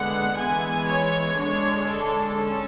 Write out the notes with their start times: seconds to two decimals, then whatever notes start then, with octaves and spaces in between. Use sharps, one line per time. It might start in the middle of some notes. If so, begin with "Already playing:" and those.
Already playing: D3 G#3 B3 F#5
0.37 E3 G#3 B3 G#5
0.87 C#5
1.37 D3 G#3 D4 C#5
1.88 A4
2.37 C#4